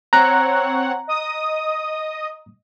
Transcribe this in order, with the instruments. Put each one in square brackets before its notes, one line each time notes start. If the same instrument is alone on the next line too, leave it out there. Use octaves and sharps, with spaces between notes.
[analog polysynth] C4 C#5 F#5 [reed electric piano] A#5 F#6
[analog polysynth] D#5 D#6